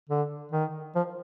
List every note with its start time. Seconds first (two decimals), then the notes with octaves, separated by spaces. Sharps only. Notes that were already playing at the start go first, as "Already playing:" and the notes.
0.09 D3
0.52 D#3
0.95 F3